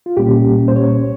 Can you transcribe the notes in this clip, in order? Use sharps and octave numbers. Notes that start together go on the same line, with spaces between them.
F4
C2 A#2 G3 A#3 C#4 G4
C5
C#5